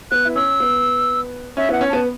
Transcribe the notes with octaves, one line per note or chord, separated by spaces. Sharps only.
B3 F#6
E4
C#4 E6
B3
C#4 E5
B3 E4 F#5
C#4
B3 A5